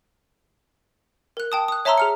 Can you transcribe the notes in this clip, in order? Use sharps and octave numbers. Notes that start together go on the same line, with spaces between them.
A#4 F#6
G5 A5 D#6
D#6 F#6
C#5 E5 A5 A#5 C6 E6
G#4 F6 C#7